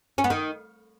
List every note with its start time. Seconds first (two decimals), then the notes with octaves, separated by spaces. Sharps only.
0.18 C#4
0.24 B3
0.30 D#3